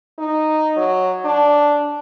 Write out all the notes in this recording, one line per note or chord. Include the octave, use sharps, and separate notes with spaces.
D#4
F#3
D4